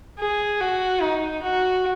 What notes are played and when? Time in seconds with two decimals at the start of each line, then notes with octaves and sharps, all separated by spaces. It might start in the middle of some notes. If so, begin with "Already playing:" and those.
0.19 G#4
0.61 F#4
1.02 D#4
1.43 F#4